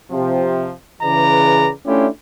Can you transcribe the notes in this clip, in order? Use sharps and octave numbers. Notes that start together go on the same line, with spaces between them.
C3 F3
C#3 E3 G#4 B4 D5 A#5
A3 C#4 D4 E4 F4 G4